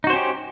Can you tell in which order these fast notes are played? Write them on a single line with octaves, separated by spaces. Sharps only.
D#4 F#4 C5 C#4 G4